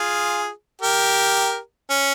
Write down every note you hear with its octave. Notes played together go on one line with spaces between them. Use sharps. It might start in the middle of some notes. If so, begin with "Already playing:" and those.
Already playing: F4 G#4
G4 A#4
C#4